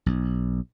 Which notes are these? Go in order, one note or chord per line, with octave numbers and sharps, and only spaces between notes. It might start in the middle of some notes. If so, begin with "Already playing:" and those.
B1